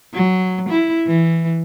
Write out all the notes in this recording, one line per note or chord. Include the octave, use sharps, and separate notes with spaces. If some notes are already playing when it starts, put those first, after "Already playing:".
F#3
E4
E3